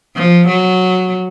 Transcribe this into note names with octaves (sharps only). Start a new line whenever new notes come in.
F3
F#3